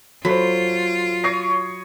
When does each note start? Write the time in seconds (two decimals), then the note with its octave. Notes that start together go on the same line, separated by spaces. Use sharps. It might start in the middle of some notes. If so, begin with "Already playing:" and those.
0.25 F#3 F4 A4 C5 B5
1.24 C#5 D#6 A#6 C7